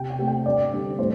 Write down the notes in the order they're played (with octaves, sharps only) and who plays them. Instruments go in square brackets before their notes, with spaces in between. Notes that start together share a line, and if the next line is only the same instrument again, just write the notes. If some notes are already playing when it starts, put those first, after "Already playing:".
Already playing: [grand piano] C3 G5
G5
A3 C4
G5
G2 D5
D3 G3 C4
A2 C5